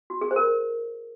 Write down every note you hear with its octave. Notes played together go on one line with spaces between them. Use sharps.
F#4
G#4
C5
A#4